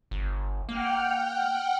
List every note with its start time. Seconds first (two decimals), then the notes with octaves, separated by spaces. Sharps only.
0.11 G1
0.69 A#3 F#5 G5 F6